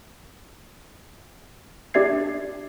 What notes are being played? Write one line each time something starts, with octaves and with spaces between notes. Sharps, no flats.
D4 G4 D5 E5 G#6 C7